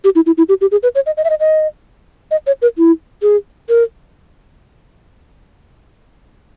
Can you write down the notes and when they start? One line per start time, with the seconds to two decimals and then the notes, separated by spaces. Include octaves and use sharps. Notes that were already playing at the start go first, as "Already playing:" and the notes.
0.04 G4
0.15 E4
0.26 E4
0.38 E4
0.49 G4
0.61 G4
0.71 G#4
0.83 B4
0.95 C#5
1.06 D#5
1.17 D#5
1.24 E5
1.30 D#5
1.40 D#5
2.31 D#5
2.47 C#5
2.62 A#4
2.78 E4
3.22 G#4
3.69 A#4